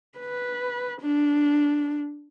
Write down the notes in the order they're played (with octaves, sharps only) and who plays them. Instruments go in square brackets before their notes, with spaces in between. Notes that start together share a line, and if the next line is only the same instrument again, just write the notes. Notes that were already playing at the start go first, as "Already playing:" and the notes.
[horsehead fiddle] B4
D4